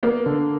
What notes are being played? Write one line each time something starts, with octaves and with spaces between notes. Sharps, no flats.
A#3 B3
D3